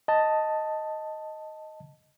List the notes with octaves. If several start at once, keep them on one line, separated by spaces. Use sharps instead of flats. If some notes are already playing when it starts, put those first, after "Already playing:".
D#5 A5